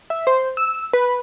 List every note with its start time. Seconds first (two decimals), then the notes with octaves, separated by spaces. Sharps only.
0.10 E5
0.27 C5
0.57 E6
0.93 B4